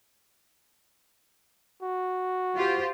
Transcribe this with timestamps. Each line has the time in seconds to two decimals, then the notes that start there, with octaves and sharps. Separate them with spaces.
1.83 F#4
2.55 F4 G4 C5